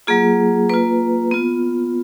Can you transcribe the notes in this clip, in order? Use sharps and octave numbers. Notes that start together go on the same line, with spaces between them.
F#3 A#3 F4 G#4
A#3 F4 B4
B3 F4